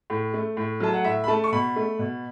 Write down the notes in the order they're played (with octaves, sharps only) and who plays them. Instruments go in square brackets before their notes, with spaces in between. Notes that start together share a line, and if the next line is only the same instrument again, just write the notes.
[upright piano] A2
A3
A2
F#3 A3 A5
F#5
A2 E5
B5
A3 A5
C#6
B2 B5
A3
B2